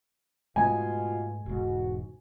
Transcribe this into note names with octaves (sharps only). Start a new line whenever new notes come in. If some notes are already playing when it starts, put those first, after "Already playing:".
G#2 B2 G#3 A3 F4 G#5
E1 G#2 F#4